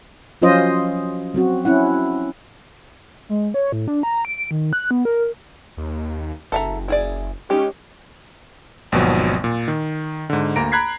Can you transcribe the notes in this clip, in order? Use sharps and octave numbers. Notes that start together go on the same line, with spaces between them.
F3 F#3 C#4 F4 C5 D#5
F#3 C4 F#4
C#4 E4 F#5
G#3
C#5
A2
D4
A#5
D7
D#3
F#6
B3
A#4
D#2
F#1 A4 E5 A#5
E4 G#4 D5
G#3 C#4 D#4 G4
G#1 D#2 B2 F3 F#3
A#2
D#3
G#2 D3
D2 A#3 A#5 A#6 D7
A#5 B5 F#6 G#6 B6 C7